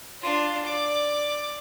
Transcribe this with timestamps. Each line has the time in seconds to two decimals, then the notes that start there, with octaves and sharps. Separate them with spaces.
0.22 D4 F4
0.65 D5 D6